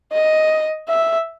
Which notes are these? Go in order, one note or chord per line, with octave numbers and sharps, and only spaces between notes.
D#5
E5